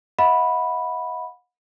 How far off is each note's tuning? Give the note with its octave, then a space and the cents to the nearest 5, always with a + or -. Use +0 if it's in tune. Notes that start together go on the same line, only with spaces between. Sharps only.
D#5 +45 F#5 -35 B5 -5